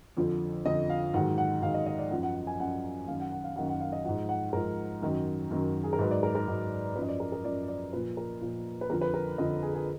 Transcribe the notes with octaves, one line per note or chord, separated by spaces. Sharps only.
F2 D3 F3
F2 D3 F3 D#5
F5
G#2 D#3 F#3 F#5
F#5
G#2 D#3 F#3 F5
D#5
D#5
D5
F#2 F3 F#5
F#5
F#5
G#5
F#2 F3 F#5
F#2 D#3 F#3 F5
F#5
F#5
F5
F#2 D#3 F#3 F#5
F#5
F5
D#5
G#2 F3 F#5
F#5
G#2 F3 A#4
F#2 D#3 F#3
F#2 D#3 F#3
G#4
A#4
G#2 F#3 B4
D5
A#4
A#4
G#2 F#3
F#2 F3 B4
D#5
D5
A#4
A#4
F#2 F3 D5
D5
A#2 F3 B4
A#4
A#2 F3
B4
F2 D3 F3 A#4
B4
A#4
F2 D3 F3 D#5
G#4
G#4